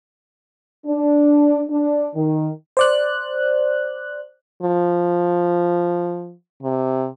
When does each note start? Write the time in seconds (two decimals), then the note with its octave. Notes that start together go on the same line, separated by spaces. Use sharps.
0.86 D4
1.69 D4
2.15 D#3
2.77 C5 D5 F#6
4.63 F3
6.63 C3